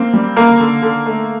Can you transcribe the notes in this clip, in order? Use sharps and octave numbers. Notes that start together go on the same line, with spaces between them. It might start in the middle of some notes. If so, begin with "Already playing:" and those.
Already playing: A#3 C4
G3
D3 A#3 A#4
D3
D3
A3